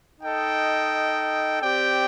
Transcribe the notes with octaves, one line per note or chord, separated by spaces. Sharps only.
D#4 A4 D#5 G5
C4 G4 D5 G5